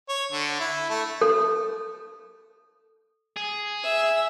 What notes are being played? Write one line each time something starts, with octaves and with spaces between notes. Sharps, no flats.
C#5
D3
E4
A3
A4
G#4
E5